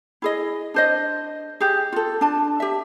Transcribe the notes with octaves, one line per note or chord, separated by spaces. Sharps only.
E4 G#4 D#5
D4 C5 D#5
G4 G#4
F4 A4
D4 A5
G4 E5